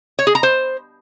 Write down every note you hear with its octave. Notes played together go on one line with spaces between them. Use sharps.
C#5
G#4
A#5
C5